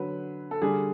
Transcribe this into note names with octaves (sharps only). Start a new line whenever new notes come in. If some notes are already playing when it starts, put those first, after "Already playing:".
Already playing: D3 F#3 B4
A4
D3 G3 G#4